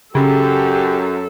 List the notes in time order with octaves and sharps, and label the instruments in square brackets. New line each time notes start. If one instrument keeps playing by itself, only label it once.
[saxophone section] F#2 [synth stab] C#3 [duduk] G4 [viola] A4